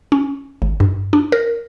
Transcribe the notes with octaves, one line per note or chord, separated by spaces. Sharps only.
C#4
G#1
G2
D4
A#4